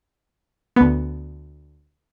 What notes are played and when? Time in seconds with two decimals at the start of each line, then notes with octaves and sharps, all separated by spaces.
0.76 D2 B3